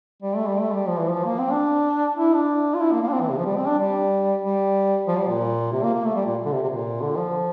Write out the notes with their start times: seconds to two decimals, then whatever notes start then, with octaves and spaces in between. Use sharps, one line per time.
0.23 G3
0.36 A3
0.48 G3
0.60 A3
0.73 G3
0.88 F3
0.98 E3
1.09 F3
1.25 A#3
1.39 C4
1.52 D4
2.17 E4
2.33 D4
2.74 F4
2.81 E4
2.92 A#3
3.03 A#3
3.09 D4
3.13 C4
3.21 E3
3.30 C3
3.38 F3
3.46 G3
3.57 C4
3.67 D4
3.78 G3
4.42 G3
5.07 F3
5.18 G3
5.29 A#2
5.72 C3
5.83 A#3
5.94 A#3
6.04 A3
6.15 G3
6.26 A#2
6.46 D3
6.53 C3
6.63 C3
6.69 A#2
7.01 D3
7.17 F3